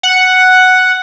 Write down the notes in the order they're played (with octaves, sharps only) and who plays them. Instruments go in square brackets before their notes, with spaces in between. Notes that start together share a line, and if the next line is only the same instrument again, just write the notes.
[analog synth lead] F#5